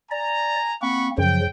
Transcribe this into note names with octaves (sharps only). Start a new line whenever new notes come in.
D5 G#5 A#5
A#3 C4 F#5 B5 C#6
F#2 C#3 F3 F#3 G5